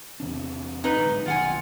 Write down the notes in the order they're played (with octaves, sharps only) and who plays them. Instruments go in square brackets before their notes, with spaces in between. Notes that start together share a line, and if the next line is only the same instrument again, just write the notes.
[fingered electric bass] E2 C3 D4
[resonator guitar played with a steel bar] D#4 B4
[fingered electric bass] D1 G#2
[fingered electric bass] F1 B1 D#3 [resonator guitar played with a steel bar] F4 F#5 G#5